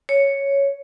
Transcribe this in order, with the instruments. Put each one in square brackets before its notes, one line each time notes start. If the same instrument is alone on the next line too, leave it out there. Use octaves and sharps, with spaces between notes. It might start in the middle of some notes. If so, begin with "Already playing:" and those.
[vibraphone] C#5